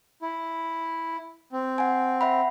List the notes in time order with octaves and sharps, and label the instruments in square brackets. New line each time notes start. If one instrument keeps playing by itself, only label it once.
[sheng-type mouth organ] E4
C4
[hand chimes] F#5 G#5
E5 F#5 B5